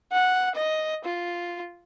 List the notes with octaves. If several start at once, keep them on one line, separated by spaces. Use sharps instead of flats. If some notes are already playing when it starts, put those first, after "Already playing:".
F#5
D#5
F4